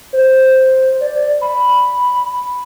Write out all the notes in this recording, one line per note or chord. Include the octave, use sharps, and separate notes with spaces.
C5
D5
B5